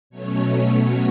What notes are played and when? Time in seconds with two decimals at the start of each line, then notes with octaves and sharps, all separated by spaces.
0.10 B2 F#3 A3 C#4 C#5